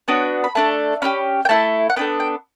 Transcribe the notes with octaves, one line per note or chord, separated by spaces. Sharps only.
B3 D4 F#4 C#5
B5
A3 D4 A4 A5
C#4 E4 G4 B5
G5
A3 E4 A4 A5
F#5
B3 D4 A4 G5
G5